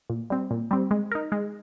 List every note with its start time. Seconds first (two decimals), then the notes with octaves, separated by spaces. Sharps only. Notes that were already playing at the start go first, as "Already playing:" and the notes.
0.10 A#2
0.30 G3 C4
0.51 A#2
0.71 G3 C4
0.91 G#3
1.11 D#4 A#4
1.32 G#3